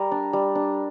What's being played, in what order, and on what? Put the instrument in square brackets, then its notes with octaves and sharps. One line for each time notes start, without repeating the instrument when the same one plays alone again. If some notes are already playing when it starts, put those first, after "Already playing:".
Already playing: [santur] G3 A#4
D4
G3
D4